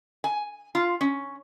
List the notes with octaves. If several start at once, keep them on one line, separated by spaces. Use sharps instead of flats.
G#5
F4
C#4